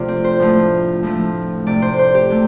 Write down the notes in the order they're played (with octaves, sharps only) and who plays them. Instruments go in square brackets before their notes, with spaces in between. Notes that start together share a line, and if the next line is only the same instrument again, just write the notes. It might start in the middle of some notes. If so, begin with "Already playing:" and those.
Already playing: [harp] C3 F3 A3 D4 F4
C4
C5
A2 F3 A3
A2 F3 A3
C3 A3 D5
C5
C5
G4
C3 A3